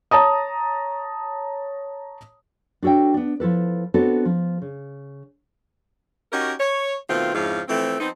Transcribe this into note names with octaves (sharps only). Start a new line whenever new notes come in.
C#5 A5 A#5 D#6
D4 F#4 A4 C#5 G5
B3 D4
F3 E4 A4 B4
B3 C4 D4 F#4 A4
F3
C#3
C#4 D#4 F#4 G4 A#4
C#5
B2 D#3 A3 C4 F4
F2 G#2 C#3 F3 E4 F5
E3 F3 A3 C4
F3 B3 C4 D#4